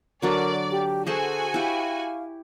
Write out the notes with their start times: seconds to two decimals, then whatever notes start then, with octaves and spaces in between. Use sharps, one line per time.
0.22 D3 F#3 D4 A#4 D5
0.71 G4
1.07 F#4 G#4 A4 C5 G#5 A5
1.54 E4 G4 F5